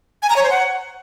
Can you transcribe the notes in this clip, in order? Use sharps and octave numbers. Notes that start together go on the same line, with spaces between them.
G#5
A#5
C#5
C5
F#5